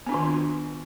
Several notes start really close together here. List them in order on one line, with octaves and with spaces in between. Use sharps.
B3 D4 F4 D#3